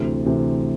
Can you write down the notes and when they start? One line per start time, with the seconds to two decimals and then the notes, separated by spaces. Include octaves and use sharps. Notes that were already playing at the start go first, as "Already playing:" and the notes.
Already playing: D2 C3 E3
0.26 D2 C3 E3